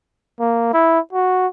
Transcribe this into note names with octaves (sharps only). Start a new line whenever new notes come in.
A#3
E4
F#4